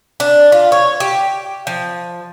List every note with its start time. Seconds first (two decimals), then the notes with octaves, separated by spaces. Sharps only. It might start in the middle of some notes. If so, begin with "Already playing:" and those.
0.20 D4
0.52 F4
0.72 C#5
1.00 G4
1.67 F3